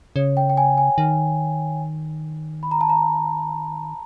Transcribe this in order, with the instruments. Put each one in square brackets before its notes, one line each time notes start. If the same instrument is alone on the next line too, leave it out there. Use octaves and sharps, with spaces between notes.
[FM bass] C#3 [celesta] C#5
[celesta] G5
G5
G#5
G#5
[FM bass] D#3
[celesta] B5
A#5
A5
A#5